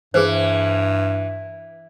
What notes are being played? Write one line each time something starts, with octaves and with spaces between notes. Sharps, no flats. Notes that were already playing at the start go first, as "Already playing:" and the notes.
G2 E3 G#4 B4 C5